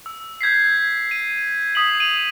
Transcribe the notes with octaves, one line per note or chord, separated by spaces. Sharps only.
E6
G6 G#6 B6 C7
D#7
D#6 B6 D#7 F#7
D#7 F7 F#7